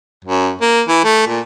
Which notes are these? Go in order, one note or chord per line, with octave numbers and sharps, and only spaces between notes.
F#2
A#3
E3
A3
A#2